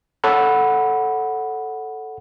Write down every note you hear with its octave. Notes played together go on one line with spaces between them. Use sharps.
A4 C#5 F#5 B5